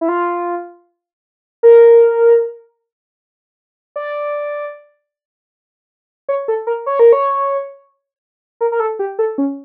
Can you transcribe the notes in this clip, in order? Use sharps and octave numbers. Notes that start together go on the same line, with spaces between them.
E4
F4
A#4
D5
C#5
A4
A#4
C#5
A#4
C#5
A#4
A#4
A4
G4
A4
C#4